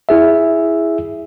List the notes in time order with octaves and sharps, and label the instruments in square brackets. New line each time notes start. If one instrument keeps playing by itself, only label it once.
[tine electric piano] E4 G#4 E5